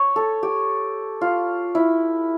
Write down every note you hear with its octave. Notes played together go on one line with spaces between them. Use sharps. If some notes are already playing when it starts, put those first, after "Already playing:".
Already playing: C#5
A4
G4
F4
E4